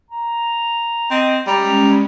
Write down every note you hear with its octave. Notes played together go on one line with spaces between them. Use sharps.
A#5
C4 D#5
G3 G#3 C#4 A#5